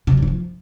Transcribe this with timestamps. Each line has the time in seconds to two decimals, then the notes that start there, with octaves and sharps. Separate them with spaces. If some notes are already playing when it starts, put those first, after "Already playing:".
0.07 C3
0.12 F3
0.17 G3
0.22 E3
0.28 F3